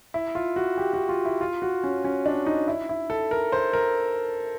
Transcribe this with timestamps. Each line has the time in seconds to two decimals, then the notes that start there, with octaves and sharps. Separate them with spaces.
0.14 E4
0.35 F4
0.56 F#4
0.77 G4
0.93 F#4
1.09 F4
1.25 E4
1.41 F4
1.62 F#4
1.84 C#4
2.04 C#4
2.26 D4
2.46 D#4
2.68 E4
2.89 E4
3.10 A4
3.31 A#4
3.52 C5
3.73 A#4